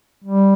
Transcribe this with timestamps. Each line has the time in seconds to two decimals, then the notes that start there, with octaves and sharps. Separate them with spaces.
0.24 G3